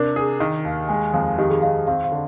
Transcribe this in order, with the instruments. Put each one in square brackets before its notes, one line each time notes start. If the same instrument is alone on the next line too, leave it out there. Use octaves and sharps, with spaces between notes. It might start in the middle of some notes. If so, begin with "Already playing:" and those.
Already playing: [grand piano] C3 D4 [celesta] A#4
[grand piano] G#4
D#3
D#2
[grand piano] G#3 [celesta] G#5
[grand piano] F2 [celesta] F5
[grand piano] D#3 [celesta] G4
[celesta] G#4
[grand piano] D#3 [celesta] F5
[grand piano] C4 [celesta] F5
[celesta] F5
[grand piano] D3